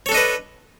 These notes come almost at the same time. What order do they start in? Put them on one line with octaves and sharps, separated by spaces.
C#5 A4 D4 D#5 B4